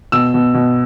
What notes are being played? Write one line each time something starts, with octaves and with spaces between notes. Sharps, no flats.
B2 E6
B2
B2